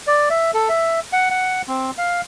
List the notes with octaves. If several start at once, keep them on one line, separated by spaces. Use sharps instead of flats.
D5
E5
A4
E5
F#5
F#5
C4
F5